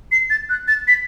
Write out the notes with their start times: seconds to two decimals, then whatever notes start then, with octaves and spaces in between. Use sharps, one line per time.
0.12 C7
0.30 A6
0.50 F#6
0.68 A6
0.88 B6